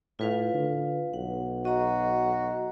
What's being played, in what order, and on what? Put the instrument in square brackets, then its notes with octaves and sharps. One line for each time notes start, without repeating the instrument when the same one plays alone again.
[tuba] A2 [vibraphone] F4 B4 F5
[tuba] D3
[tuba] B1 [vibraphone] F#5
[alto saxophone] F#4 [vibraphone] D#5 A#5